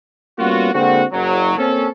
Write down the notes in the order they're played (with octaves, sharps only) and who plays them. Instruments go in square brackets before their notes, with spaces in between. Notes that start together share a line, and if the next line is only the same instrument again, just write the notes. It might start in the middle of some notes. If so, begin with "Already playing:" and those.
[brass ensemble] G3 A#3 B3 C#4 F4 F#4
D3 G#3 A#3 C4 F#4
F#1 F#3
A#3 C4 C#4 A4